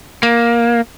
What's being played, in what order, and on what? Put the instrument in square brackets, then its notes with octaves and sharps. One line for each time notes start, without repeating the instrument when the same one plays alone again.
[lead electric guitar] A#3